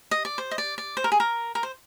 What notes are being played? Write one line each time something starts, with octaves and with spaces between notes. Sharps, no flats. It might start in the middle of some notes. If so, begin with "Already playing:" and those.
D#5
D5
C5
D#5
D5
D5
C5
A#4
G#4
A#4
A#4
C5